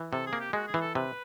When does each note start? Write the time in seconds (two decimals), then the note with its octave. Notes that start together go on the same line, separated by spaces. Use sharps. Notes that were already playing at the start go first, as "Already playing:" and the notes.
Already playing: E3
0.12 C3 A4
0.27 G#4
0.33 A#3
0.40 G4
0.53 G#3 F#4
0.67 G#4
0.74 E3
0.81 A4
0.95 C3 B4